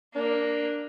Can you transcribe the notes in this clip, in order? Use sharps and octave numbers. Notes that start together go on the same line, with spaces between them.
A#3 D4